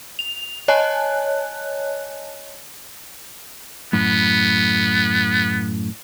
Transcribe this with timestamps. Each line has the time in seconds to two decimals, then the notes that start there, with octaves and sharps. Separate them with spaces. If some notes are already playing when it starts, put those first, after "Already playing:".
0.19 F7
0.68 C#5 D#5 G#5 A5 F#6
3.93 F#2 A2 B3